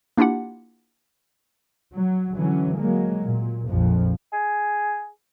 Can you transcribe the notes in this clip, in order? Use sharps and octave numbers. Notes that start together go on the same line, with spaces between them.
A#3 D4 E4 F4 G4 F#5
F#3
D3 E3 F#3 C#4
F#3 G#3 A#3
A#2
A#1 F2 F3
G#4